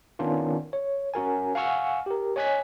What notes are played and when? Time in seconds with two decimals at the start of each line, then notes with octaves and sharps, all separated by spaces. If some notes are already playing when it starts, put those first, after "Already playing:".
0.19 D#3 B3 C#4 D4 F4
0.73 C#5
1.14 C#4 F#4 A#4 G#5
1.55 F5 F#5 G#5 C#6 E6 F6
2.06 G4 A#4
2.36 C#5 D#5 G#5 F#6 G#6 B6